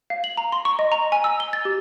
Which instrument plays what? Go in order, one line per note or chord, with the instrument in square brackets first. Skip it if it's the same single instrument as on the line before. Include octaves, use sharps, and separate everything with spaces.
[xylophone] F5
F#7
A#5
C6
C#6
D#5
A#5
G#5
E6
G7
A6
G4